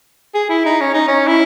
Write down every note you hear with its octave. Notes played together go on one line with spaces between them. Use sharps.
G#4
E4
D#4
C#4
D#4
C#4
E4